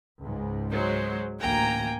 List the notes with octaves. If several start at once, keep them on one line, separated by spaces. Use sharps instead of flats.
C#2 G#2
F#3 G#3 C5 C#5
A1 D2 A#3 G5 G#5 A#5